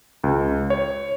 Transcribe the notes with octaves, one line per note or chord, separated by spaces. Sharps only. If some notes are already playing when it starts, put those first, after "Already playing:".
C#2
C#5